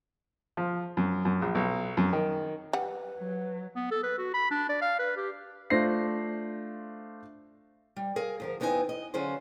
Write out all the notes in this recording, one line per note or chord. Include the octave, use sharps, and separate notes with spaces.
F3
F#2
F#2
A#1
B1
F#2
D#3
G3 B4 F#5
F#3
B3
A4
B4
F#4
B5
D4
D5
F5
B4
G4
A3 D4 F4 C5 A#6 C7
G3
G#4 A#4 F5
D2 F3 A#4
E2 B3 C4 D#4 G4 G#5
D#5
D3 F#3 C#4 F4 G#4 C5